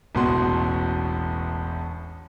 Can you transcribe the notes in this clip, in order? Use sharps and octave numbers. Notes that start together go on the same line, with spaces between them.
E1 A1 B2 F#4 C6